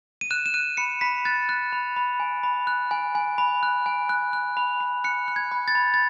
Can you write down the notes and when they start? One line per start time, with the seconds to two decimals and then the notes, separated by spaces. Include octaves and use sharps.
0.21 D#7
0.31 F#6 E7
0.46 E7
0.54 F#6 D#7
0.77 B5 C#7
1.01 B5 B6
1.25 F#6 A6
1.49 F#6
1.72 B5
1.96 B5
2.20 G#5
2.43 B5
2.67 F#6
2.91 G#5
3.15 G#5
3.38 B5
3.63 F#6
3.86 G#5
4.09 F#6
4.33 F#6
4.57 B5
4.81 B5
5.04 F#6 C#7
5.28 F#6
5.36 G#6
5.51 B5
5.68 A6
5.75 B5
5.94 A6